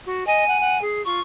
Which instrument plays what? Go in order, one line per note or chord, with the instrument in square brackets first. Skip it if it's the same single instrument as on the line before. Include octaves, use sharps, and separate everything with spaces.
[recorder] F#4
[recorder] D#5 [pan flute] G#5
[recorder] F#5
F#5
G#4
[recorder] F4 [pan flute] C#6